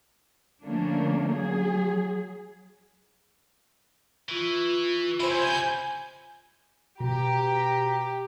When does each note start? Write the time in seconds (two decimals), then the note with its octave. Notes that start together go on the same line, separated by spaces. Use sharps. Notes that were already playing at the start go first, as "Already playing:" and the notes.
0.64 D3 F3 A3 A#3 C#4 D4
1.31 F#3 G#4
4.29 E3 F4 C#6
5.20 C#2 C3 E4 C5 G#5 G6
7.00 B2 G4 A#5